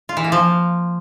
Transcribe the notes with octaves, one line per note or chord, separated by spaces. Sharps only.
F4
E3
A#3
F3